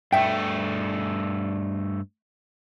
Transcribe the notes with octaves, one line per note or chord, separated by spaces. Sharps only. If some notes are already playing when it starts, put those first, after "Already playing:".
G2 A3 E5 G5